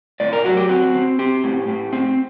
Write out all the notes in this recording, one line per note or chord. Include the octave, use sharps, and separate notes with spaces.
A2 D5
A#4
F#3 F#4
G4
C4 F#4
C4
C4 G4
A2
A2
C4